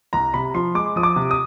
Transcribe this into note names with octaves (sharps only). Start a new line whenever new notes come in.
C2 A#5
C3 B5
F3 C6
G#3 D6
F3 D#6
D6
C3
D#6